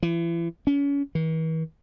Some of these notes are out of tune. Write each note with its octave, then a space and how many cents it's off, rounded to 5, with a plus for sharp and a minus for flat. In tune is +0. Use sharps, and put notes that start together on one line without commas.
E3 +35
C#4 +30
E3 -45